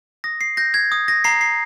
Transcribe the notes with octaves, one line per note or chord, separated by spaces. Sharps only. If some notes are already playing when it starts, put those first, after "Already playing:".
D#6 A#6
C7
G6 A#6
G#6
D#6
A#6
A#5 C7
C7